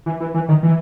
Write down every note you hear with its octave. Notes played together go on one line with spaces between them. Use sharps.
E3
E3
E3
D#3
E3